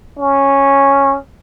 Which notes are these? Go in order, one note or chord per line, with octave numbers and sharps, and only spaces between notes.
C#4